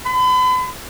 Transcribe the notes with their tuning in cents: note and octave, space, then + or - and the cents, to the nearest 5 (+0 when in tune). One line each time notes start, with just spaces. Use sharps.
B5 +40